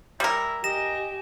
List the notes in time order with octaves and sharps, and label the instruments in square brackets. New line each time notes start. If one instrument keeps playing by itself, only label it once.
[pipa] G3 A#4 [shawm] E4
[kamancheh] G4 G#5 [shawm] D#5 [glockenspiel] A#6 E7